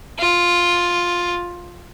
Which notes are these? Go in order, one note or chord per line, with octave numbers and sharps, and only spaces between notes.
F4